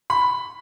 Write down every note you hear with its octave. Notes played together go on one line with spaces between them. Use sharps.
B5